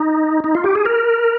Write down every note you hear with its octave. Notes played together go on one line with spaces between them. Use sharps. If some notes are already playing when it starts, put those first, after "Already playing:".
Already playing: D#4
D#4
F4
G4
G#4
A#4